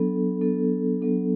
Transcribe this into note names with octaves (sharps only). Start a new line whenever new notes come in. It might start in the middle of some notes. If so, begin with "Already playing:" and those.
Already playing: F#3 B3 D4 A4
F#3 B3 D4 A4
F#3 B3 D4 A4